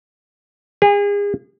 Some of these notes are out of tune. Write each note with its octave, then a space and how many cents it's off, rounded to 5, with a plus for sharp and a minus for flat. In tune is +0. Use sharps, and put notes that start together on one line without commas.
G#4 -35